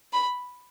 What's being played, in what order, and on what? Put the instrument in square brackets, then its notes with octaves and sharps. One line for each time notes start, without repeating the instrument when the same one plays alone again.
[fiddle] B5